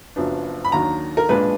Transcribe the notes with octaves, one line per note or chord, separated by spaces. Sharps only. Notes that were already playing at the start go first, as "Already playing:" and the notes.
F#1 F#2 F3 B3 D4
B5
D#2 D#3 F#3 D4 A#5
A#4
B1 A#2 G#3 B3 D4 B4